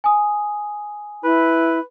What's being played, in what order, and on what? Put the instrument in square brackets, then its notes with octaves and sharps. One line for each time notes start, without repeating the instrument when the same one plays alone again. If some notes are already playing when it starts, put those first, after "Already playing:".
[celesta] G#5 D#6
[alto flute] E4 [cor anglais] B4